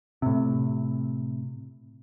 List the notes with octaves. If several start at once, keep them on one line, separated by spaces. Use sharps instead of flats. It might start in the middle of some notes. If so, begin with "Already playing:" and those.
A2 C3